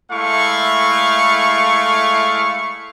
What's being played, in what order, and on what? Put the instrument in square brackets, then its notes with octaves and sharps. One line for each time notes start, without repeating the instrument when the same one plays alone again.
[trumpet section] G#3 A3 E4 F5 C#6